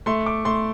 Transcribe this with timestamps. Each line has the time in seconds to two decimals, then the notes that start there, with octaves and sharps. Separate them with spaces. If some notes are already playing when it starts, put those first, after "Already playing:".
0.06 A3 C6
0.26 D6
0.45 A3 C6